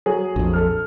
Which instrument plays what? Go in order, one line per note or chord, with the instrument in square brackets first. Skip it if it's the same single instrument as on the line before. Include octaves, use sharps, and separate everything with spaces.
[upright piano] F#3 G#4
[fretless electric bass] A#1 F2
[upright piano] A4 F6